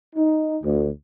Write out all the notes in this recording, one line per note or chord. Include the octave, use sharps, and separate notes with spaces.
D#4
D2